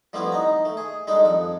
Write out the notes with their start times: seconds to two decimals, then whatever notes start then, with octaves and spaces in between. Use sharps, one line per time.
0.13 F3 G3 A3 B3 C4 E4
0.32 D#4 A#5
0.65 A3
0.77 G#4
1.07 G3 G#3 D4 D#4 A4
1.24 F2 A4